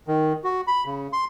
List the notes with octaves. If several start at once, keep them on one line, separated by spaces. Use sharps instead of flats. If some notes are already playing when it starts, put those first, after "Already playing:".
D#3
F#4
B5
C#3
C6